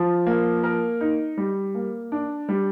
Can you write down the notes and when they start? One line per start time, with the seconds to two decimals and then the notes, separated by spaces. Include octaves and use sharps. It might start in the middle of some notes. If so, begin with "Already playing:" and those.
Already playing: F3 F4
0.27 A#3
0.64 A#4
1.01 D#4
1.37 G3
1.75 A#3
2.12 D4
2.49 G3